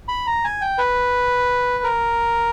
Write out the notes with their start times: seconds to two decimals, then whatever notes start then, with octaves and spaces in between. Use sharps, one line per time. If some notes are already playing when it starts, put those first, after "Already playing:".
0.08 B5
0.27 A#5
0.44 G#5
0.61 G5
0.78 B4
1.84 A#4